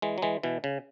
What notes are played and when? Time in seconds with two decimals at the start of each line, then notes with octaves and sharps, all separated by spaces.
0.02 E3 G#3
0.18 F#3
0.22 E3 G#3
0.43 B2 E3
0.64 C#3